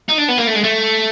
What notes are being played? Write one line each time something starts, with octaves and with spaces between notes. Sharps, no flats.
D#4
D4
B3
A#3
A3
G#3
A3